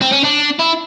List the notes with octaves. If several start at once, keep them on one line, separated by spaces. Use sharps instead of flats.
C4
C#4
D4
E4